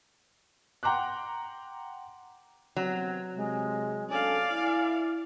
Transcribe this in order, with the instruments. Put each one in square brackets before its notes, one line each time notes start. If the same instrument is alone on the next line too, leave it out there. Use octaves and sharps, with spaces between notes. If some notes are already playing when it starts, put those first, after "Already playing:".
[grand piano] F#5 G5 A#5 C6 D6 F#6
[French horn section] C3 B3 C4 [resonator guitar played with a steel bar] F#3
[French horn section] C3 [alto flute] G#3
[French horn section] C#4 D4 A4 [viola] D5 F5 [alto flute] G#5
[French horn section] E4